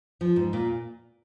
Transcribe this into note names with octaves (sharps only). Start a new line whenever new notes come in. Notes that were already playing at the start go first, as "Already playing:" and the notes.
F3
G#2
A#2